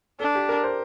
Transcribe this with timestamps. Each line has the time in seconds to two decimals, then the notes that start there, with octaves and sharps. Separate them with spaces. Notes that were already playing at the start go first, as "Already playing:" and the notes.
0.20 D4 A4
0.35 G4
0.49 A#4
0.64 C5